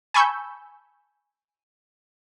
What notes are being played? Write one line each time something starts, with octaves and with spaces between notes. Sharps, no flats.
G#5 A5 B5 C#6 E6 G6